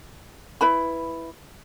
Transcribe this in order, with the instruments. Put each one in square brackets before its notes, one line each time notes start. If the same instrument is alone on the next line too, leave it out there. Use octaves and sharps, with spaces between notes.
[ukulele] E4 B4 B5